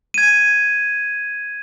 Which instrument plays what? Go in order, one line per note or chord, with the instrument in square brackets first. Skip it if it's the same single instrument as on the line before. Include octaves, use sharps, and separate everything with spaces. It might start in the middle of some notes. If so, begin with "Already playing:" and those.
[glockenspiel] G#6 D#7